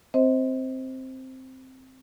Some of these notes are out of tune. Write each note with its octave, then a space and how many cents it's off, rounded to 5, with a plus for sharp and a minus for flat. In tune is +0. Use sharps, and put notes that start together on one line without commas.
C4 +0 C5 +0 D#5 +40